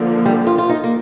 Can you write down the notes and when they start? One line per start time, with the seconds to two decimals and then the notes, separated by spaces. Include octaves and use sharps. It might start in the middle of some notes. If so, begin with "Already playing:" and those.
Already playing: D3 F3 A#3
0.25 G3
0.47 F4
0.58 F4
0.69 D#4
0.84 A#3